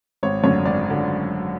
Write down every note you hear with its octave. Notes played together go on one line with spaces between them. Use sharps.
G#1 C#5
F#2 D3 C#5
G#1 D5
D3